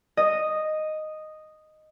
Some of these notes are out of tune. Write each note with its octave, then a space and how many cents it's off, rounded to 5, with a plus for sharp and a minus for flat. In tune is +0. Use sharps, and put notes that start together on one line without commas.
D#5 -5